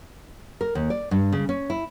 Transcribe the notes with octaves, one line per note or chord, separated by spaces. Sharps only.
A#4
D#2
D5
G2
C#3
C#4
E4